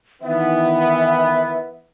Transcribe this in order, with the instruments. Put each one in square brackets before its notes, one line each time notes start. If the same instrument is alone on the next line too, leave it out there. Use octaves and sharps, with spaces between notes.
[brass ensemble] D#3 E3 B3 [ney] E5